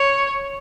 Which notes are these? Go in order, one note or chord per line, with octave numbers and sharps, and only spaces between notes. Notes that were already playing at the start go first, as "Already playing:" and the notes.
Already playing: C#5